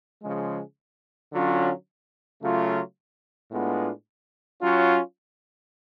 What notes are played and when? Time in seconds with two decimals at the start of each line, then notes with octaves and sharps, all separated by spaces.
0.23 C#3 F3 G#3
1.32 D3 F#3 C#4 F4
2.41 C#3 F#3 A3 F4
3.51 A2 G#3 B3 D4 F4
4.61 F#3 C#4 F4